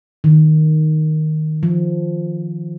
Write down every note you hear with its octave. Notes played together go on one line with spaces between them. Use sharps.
D#3
F3